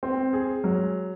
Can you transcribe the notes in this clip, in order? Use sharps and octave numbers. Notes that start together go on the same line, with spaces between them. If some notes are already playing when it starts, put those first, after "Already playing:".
C4
G#4
F#3